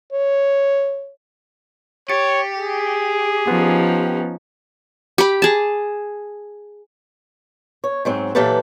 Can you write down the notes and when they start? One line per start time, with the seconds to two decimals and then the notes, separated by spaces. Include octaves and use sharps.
0.13 C#5
2.09 G4 C#5 A6 C#7
2.58 G#4
3.47 F3 B3 C#4 D#4 B4
5.18 G4 B5
5.42 G#4 A5
7.84 C#5
8.05 G#2 F#3 C4
8.35 A#2 E3 F#3 G4 A4 B4